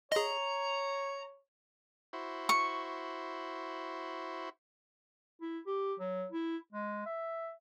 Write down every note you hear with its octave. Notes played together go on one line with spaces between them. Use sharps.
G#4 C#5 D#5 A#5 C6
E4 F#4 C5
C#6
E4
G4
F#3
E4
G#3
E5